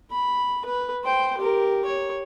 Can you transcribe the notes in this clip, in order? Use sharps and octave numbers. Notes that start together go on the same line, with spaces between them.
B5
B4
C5 G5
G4 A#4
C#5